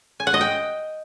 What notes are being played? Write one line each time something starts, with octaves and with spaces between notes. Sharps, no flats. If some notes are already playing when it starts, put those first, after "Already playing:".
G#5
F#5
D#5
G5